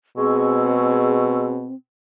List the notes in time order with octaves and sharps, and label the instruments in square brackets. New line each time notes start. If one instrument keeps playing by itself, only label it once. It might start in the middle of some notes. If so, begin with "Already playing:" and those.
[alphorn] B2 [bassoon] G#3 [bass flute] C4 [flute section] G#4 C#6 E6